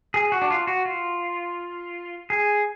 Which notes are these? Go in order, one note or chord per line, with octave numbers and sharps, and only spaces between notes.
G#4
F#4
D4
F4
F#4
F4
G#4